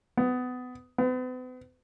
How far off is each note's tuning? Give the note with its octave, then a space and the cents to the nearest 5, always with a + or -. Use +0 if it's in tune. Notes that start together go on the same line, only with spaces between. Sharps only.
B3 +25
B3 +45